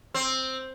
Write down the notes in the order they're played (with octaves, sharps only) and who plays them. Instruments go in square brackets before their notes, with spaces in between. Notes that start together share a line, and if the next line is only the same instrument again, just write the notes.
[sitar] C4